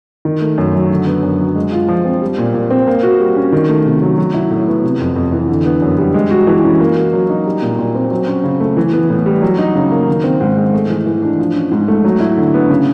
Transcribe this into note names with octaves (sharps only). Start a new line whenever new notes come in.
D#3
A3
F#2
F#3
D3
B3
F#2
F#3
G#3
F4
F3
C4
G3
A#2
A#2
C4
A#3
F#4
G3
C#4
D#3
A3
C3
F#3
F#3
E4
A2
B3
C3
F2
F2
E3
D3
B3
F#2
G3
G#3
F#4
E3
C#4
A#3
F#4
F#3
D#4
G3
A#2
A#2
C4
F#3
C#4
C#3
A3
E3
B3
A2
G3
F#3
D#4
C#3
A#3
D#3
C4
G#2
G#3
A3
E3
E3
D4
F3
C#4
G#2
A3
F#3
E4
D3
B3
C#3